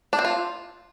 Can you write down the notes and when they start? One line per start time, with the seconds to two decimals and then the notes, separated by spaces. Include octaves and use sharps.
0.13 D4
0.19 C4
0.25 F4